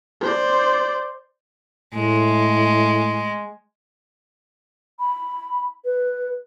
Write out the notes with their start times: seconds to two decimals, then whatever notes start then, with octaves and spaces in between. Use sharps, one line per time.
0.21 C5 D5
1.95 A2 G#3
4.99 B5
5.85 B4